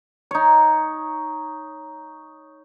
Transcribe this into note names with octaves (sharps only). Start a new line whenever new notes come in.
D#4 C#5